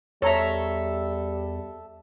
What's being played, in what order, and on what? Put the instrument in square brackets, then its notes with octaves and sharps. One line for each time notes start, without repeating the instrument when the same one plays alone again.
[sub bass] E2 [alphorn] G3 [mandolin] A4 E5 [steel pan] C#5 A#5